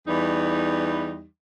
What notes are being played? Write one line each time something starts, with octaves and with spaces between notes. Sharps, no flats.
E2 E3 G3 D#4